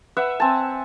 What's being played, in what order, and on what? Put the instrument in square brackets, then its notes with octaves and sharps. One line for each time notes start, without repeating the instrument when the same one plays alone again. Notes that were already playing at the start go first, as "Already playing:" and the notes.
[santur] B4 E5 F#5
C4 G#5 A5